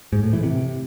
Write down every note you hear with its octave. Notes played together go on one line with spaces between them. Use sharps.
G#2
A2
E3
C3